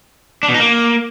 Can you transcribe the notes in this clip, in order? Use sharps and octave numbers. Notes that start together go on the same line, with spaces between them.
D4
B2
D#4
A#3